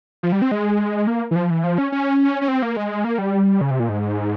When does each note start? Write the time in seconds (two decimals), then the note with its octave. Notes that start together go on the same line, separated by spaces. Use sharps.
0.23 F3
0.32 G3
0.42 C4
0.51 G#3
1.07 A#3
1.31 E3
1.36 F3
1.50 E3
1.64 F3
1.78 C#4
1.92 C#4
2.41 C#4
2.48 C4
2.62 A#3
2.76 G#3
3.04 A#3
3.18 G3
3.61 C#3
3.71 C3
3.80 A#2
3.89 G#2